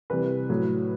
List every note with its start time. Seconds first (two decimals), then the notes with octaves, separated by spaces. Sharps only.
0.10 C3 E3 G3 B4
0.50 A2 F#3